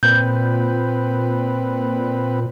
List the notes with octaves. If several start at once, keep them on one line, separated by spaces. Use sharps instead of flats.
A#2 C4 B4 G6